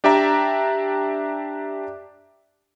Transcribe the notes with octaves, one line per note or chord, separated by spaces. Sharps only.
D4 G4 D5 E5 A#5